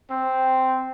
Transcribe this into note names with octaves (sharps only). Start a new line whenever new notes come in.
C4